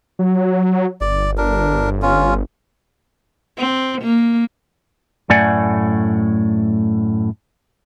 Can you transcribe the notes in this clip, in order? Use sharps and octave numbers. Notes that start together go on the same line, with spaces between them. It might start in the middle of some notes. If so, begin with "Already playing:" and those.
F#3
G1 D5
D4 A#4
C#4 F4
C4
A#3
F#2 A2 A3 D5 F#5 G#5